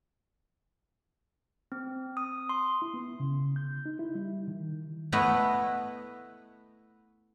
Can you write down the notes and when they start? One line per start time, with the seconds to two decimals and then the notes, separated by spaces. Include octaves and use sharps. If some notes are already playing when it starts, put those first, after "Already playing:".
1.72 C4
2.17 D#6
2.49 C6
2.82 E4
2.94 B3
3.20 C#3
3.56 G6
3.86 D#4
3.99 E4
4.15 G3
4.48 D#3
5.12 A3 B3 E4 B4 D#5